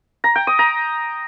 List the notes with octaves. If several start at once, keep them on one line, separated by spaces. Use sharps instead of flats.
A#5
G5
D#6
A#5